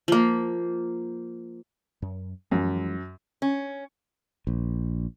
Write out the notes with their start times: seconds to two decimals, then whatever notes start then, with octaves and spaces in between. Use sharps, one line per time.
0.08 F3 A#3
2.02 F#2
2.51 F#2 E3 F3 G#3
3.42 C#4
4.47 A#1